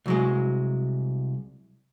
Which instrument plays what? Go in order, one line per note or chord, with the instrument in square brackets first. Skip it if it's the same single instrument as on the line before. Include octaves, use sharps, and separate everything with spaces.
[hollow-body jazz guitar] C2 F#3 G#3